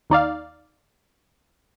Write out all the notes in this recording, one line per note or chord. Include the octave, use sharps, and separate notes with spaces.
D#2 D#4 D5 F5